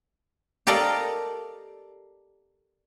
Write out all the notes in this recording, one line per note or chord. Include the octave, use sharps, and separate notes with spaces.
G4 A4 A#4 D5 D#5 F5